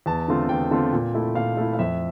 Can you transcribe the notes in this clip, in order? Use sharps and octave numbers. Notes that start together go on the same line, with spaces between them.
E2 A5
D3 A3 C4 F4
E2 G5
D3 A3 C4 F4
A#2
A3 E4
A#2 F5
A3 E4
F5
F2 E5